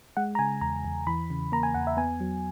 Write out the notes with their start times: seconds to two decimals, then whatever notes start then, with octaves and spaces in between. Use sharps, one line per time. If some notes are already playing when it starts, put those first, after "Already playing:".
0.17 G#3 F#5
0.35 A#5
0.39 C#3 G#5
0.61 E2 A#5
0.85 E2
1.07 E3 B5
1.30 C#3
1.52 A#3 A#5
1.63 G#5
1.75 E2 F#5
1.87 E5
1.97 B3 G#5
2.20 F#3